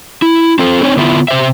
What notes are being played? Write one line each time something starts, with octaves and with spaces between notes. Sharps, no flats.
E4
C4 F4 A4 C5
C4 D#4 C#5
D3 B3 E4 F4
C3 C5 E5